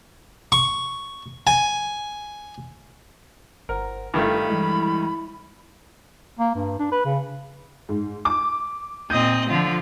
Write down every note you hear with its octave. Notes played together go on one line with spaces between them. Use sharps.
C#6
G#5
G1 A#4 C5 F#5
G2 D#3 A3 E4 F5 B5
E3 G3 G#3 E4
A#3
G2
D4
B4
C#3
G#2
D6
A#2 C4 D#5 G6 D#7
D3 F3 F4